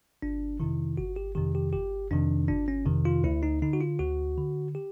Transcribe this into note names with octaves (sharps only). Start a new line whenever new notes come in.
G1 D4
F2 C3 D#3 E4
G1 F#4
G4
F2 C3 D#3 G4
G4
G1 G4
F2 C3 D#3 D4
G1 D4
C#4
F2 C3 D#3
F4
D2 E4
D#4
D3 D#4
F#4
F4
D2 F#4
D3
G4